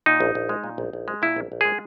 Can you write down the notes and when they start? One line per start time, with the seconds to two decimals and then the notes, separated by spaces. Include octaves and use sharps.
0.06 A#2 D#4
0.20 A#1
0.35 A#1
0.49 G#3
0.64 A#2
0.78 A#1
0.93 A#1
1.08 G#3
1.22 A#2 E4
1.36 A#1
1.52 A#1
1.61 G#3 G#4